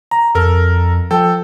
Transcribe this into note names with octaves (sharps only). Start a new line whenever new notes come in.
A#5
F2 A4 A#4
F3 A4 G5